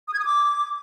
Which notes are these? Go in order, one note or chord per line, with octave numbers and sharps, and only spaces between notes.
D#6
G#6
D#6
D6